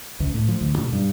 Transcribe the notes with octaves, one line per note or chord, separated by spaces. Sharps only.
C#2
A2
F3
D2
B2
G2